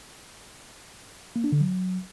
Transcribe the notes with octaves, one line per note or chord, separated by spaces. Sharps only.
A#3
D4
D3
F#3